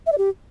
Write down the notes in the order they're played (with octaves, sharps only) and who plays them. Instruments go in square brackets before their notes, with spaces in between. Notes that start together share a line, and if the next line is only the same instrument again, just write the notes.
[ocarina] E5
D5
G4